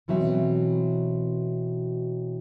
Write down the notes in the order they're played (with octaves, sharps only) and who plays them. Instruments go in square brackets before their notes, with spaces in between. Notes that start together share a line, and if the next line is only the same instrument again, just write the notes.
[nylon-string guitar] B2 E3 F#3 C4 E5